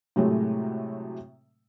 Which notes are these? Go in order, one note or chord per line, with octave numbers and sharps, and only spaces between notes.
A2 C3 F#3 G#3 A3